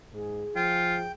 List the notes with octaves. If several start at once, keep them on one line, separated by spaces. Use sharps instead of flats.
G#2 G#4
F3 F4 G5